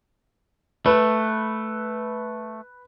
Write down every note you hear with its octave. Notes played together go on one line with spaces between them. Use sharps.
A3 B4